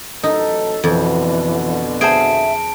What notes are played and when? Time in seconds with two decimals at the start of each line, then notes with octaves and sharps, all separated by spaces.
0.24 A1 F#3 D#4 A4
0.84 F2 B2 D3 E3
2.01 G#4 C5 E5 A5 D7